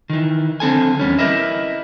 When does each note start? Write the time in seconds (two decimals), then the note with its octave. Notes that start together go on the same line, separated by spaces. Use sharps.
0.10 D#3 E3
0.60 D3 C4 A4 G#5
0.99 E2 G3 C#4
1.19 E4 G4 A#4 B4 D#5 E5